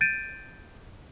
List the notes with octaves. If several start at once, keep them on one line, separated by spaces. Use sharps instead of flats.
G6 A6 D7 D#7